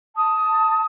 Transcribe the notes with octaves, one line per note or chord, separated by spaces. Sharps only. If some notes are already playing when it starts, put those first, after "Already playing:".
A5 D#6